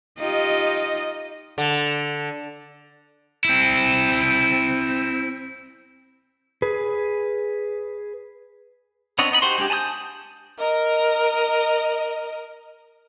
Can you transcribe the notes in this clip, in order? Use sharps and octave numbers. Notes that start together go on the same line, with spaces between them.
D#4 F4 G4 D#5
D3
C4 E4
G#4 B4
B3 C4 D4 C#5 D#5
B3 D#4 D#5 B5
D#4 F#4 G4 C5 C6
G#3 D4 G4
G#5 A5 B5 D#6 G6
A#4 D#5